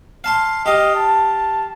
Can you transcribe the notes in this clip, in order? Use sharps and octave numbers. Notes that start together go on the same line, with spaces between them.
F5 A5 C6
G4 D#5 F5
A5